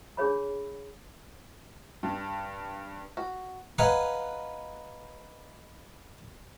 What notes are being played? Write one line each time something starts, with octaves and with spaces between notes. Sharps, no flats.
D4 G#4 C#5 B5
G2
F#4
B4 D#5 F5 F#5 G#5 A#5